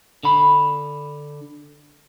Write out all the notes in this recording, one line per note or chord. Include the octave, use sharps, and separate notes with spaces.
D3 B5